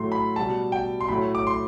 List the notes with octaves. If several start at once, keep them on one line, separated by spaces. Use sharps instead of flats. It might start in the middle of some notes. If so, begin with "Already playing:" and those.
Already playing: A2 F#3 A3 C6
B5
B2 G3 A5
G5
C6
A2 F#3 A3 B5
D6
C6